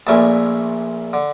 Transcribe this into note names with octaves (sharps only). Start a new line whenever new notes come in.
A#1 A#2 A3 C#4 E4 A5
D3